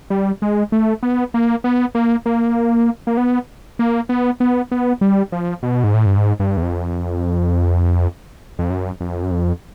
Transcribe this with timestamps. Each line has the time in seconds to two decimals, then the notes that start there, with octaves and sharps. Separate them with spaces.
0.10 G3
0.42 G#3
0.72 A3
1.03 B3
1.34 A#3
1.64 B3
1.95 A#3
2.26 A#3
3.07 A#3
3.17 B3
3.79 A#3
4.09 B3
4.40 B3
4.71 B3
5.01 G3
5.32 F3
5.63 B2
5.84 G#2
5.94 A2
6.06 G2
6.17 G#2
6.40 G2
6.57 E2
6.62 F2
8.59 F2
8.70 F#2
9.01 F2
9.23 F#2
9.31 F2